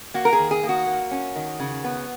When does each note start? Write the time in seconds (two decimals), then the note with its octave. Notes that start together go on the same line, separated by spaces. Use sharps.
0.14 A#3 F#4
0.25 A#4
0.33 G#4
0.39 D#3
0.51 G#4
0.63 A#3
0.69 F#4
0.87 A#3
1.11 C#4
1.36 D#3
1.60 C#3
1.84 B3